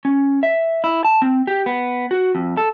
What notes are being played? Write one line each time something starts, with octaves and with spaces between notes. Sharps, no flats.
C#4
E5
E4
A5
C4
G4
B3
F#4
F2
A4